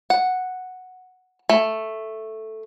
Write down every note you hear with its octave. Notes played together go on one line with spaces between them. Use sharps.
F#5
A3